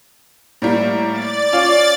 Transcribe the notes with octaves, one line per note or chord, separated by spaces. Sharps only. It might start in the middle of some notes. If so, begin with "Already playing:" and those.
A2 G3 A#3
D5 A6
C#4 F4 F5